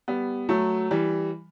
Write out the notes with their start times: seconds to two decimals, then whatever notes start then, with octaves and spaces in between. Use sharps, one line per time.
0.08 G3 B3
0.49 F#3 A3
0.91 E3 G3